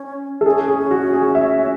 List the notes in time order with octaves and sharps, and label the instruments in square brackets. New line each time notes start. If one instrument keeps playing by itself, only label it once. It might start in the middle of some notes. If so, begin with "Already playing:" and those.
Already playing: [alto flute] C#4
[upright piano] A4
[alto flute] C#4 [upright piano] G#4
[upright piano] G#4
F#4
G#4
E5